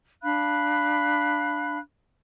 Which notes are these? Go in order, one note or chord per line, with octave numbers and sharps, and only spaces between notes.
D4 F5 B5 F#6